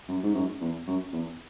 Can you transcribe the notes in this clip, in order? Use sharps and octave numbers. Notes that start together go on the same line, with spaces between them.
F#2
G#2
F#2
E2
F#2
E2